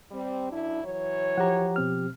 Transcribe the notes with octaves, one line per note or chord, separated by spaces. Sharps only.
G3 C4
F#2 D4 E4
E3 F#3 C#5
F3 G4 F#5 A#5
B2 C4 F6